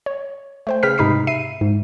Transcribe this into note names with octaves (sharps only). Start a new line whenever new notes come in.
C#5
A3 C5 G5
C#3 B4 G5 F6 B6
G#2 C3 D#4 B5 D#6 C7
E5 C7 D#7
G#2